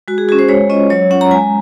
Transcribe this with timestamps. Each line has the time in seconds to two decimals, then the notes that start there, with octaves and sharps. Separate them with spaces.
0.08 G#3 F#4
0.18 G#4
0.29 F#4 G#4
0.32 C#4
0.39 C5
0.49 G#3 C#5
0.69 C#4 F4 D#5
0.90 F#3 C#5
1.11 C#4 F4 F#5
1.21 A#5
1.31 G#3 G#5